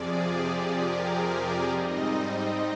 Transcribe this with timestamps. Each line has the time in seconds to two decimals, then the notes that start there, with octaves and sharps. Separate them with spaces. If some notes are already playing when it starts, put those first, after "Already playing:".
Already playing: F2 C3 F3 G#4 D5
0.20 G4
0.50 G#4
0.80 A#4
1.10 G#4
1.40 D5
1.69 G#2 G3 C4 D#4 D#5
2.29 D#5